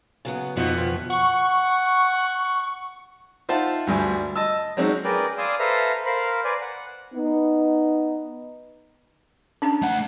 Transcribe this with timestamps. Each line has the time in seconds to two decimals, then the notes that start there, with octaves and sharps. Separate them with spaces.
0.25 C#3 F#3 B3
0.57 F2 B2 F3 B3 D#4 F#4
0.78 F3
1.10 F#5 C#6
3.49 D#4 F4 C5 E5 F#5 A5
3.87 D2 G2 G3 G#5
4.35 D#5 A5 D#6 E6
4.77 F#3 G#3 C4 C#4 D#4
5.04 G#4 A#4 B4 D5 G5
5.38 D5 F5 G#5 C6 D#6 E6
5.59 A4 B4 C5 E5 F5 A#5
6.06 A#4 C5 F5 B5
6.44 B4 C5 D5 G#5
6.61 F#5
7.14 B3 D#4
9.62 C#4 D4 A5
9.82 A3 F#5